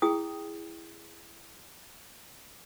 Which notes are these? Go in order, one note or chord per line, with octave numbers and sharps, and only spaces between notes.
E4 G#4 G5 D#6